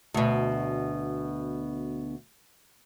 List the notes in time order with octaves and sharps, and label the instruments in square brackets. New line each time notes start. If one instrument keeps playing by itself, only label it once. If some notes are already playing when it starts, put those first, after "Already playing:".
[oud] D2 B2